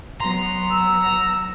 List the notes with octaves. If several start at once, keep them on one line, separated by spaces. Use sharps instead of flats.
F#3 B3 A#5 C6
E6